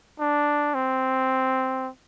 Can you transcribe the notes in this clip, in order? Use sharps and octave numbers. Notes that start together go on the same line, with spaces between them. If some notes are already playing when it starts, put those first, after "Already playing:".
D4
C4